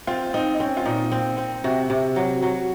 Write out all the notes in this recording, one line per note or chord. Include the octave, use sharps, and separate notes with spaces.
C4 F4
C4 D#4
D#4
C4 C#4
F4
A#2 D#4
C4
C4
C3 F#4
C3
F#3
F#3